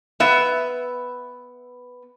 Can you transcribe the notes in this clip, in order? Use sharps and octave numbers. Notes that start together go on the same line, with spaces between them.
B3 E5